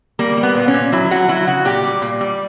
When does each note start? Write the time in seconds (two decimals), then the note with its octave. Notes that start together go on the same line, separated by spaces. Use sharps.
0.19 G3 A#3
0.37 G3
0.43 B3
0.55 A#2
0.68 C#4
0.74 A#2
0.92 F#3 E4
1.11 F#3 F#4
1.29 F#3 E4
1.47 C#3 F#4
1.65 A#2 G4
1.84 G3
2.02 A#2
2.21 G3